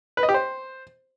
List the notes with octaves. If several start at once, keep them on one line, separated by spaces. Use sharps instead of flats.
B4
D#5
G4
C5